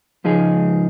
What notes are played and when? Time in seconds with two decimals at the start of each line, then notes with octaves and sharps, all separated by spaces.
0.24 C#2 F3 D#4 G#4